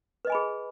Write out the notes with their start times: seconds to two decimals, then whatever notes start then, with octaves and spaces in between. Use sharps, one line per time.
0.25 B4
0.27 D#5
0.30 G#5
0.32 B5
0.35 G#4